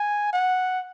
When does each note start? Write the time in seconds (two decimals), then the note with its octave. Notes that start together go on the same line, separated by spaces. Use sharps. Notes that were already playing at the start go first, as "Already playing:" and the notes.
Already playing: G#5
0.33 F#5